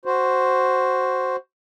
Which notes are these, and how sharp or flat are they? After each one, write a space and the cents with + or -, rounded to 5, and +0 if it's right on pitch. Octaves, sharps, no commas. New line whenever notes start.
F#4 +5 C5 +0